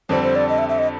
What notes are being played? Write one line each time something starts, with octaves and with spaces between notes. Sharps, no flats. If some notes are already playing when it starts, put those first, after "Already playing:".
F2 D3 G3 C4 C5
C5
D5
D#5
E5
E5
D#5